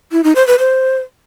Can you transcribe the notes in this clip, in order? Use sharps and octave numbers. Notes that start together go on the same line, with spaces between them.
E4
D#4
C5
B4
C5